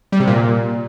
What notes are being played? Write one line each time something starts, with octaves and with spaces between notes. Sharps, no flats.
G3
C3
A#2